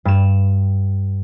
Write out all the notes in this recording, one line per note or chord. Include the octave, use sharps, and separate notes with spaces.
G2 E7